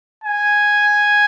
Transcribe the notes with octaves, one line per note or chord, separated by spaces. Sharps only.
G#5